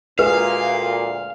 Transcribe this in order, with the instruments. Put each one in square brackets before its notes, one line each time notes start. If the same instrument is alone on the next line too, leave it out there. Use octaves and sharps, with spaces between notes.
[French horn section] D2 A#2 [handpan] G#4 [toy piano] B4 [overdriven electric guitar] F5